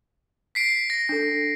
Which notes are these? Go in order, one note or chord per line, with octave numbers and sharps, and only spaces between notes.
B6 C7 D7
A#6
D4 A4